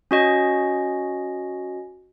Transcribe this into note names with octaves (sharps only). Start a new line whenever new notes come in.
C#4 F#4 D#5